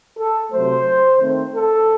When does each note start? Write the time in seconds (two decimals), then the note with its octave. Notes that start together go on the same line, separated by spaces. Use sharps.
0.19 A4
0.53 C3 F#3 A3 C5
1.20 D#3 A3 C4
1.55 A4